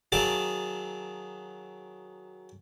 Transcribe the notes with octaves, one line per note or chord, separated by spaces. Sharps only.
D#3 F#3 G#4 F5 A5 D6